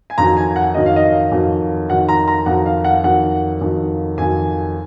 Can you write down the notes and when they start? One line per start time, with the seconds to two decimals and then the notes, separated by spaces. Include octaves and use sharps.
0.10 G#5
0.18 F2 D#3 F#3 A#5
0.37 G#5
0.56 F#5
0.74 F2 D#3 F#3 D#5
0.86 F5
0.96 D#5
1.31 F2 D#3 F#3
1.89 F2 D#3 F#3 F#5
2.09 A#5
2.28 A#5
2.46 F2 D#3 F#3 F#5
2.66 F5
2.85 F#5
3.04 F2 D#3 F#3 F#5
3.61 F2 D#3 F#3
4.18 F2 D#3 F#3 G#5